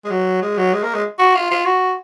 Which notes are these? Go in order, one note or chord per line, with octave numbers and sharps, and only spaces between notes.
G#3
F#3
G#3
F#3
G#3
A#3
G#3
F#4
F4
F4
F#4